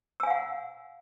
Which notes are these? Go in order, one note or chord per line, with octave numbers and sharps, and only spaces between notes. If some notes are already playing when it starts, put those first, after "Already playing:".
F5 F#5 G#5 E6